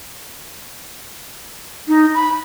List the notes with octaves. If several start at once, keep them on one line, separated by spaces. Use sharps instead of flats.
D#4
B5